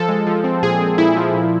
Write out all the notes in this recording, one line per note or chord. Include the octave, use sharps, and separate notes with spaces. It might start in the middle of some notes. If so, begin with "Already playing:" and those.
Already playing: F3 A4
G#3
F3
C4
A#2 G#4
C4
A#2 E4
F3
A#2